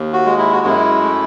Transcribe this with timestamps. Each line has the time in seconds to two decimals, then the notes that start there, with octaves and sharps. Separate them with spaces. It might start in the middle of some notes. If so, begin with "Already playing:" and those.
Already playing: D#2
0.13 F#4
0.25 G#3
0.38 E4
0.52 F#4
0.64 F#2 E4
1.02 A3